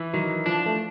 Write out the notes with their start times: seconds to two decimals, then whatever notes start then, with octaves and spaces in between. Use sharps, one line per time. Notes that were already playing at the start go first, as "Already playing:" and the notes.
Already playing: E3
0.13 D#3 F#3
0.46 F3 D4
0.66 A3